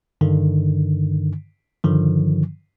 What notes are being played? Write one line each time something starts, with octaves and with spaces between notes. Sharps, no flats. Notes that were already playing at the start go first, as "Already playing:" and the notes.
G2 D3 D#3
G2 D3 D#3 F3